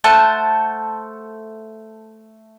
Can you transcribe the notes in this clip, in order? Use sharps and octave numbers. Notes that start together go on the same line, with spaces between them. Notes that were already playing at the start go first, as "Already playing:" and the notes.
A3 C5 F#5 A5